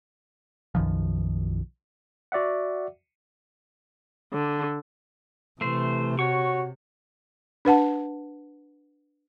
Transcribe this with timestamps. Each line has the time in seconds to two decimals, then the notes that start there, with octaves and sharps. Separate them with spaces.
0.75 B1 F#2 D#3 F3
2.32 F#4 D5 E5 F#5
4.33 D3
5.61 C3 E3 A3 C5
6.19 F#4 C#5 C#6
7.65 D4 B4 F#5 A5